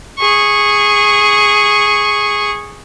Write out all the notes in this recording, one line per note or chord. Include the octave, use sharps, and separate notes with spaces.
G#4 C#6